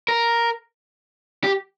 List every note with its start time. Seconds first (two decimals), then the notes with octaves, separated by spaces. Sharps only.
0.08 A#4
1.44 G4